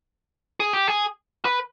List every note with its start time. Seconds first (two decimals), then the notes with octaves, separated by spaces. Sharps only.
0.60 G#4
0.73 G4
0.88 G#4
1.45 B4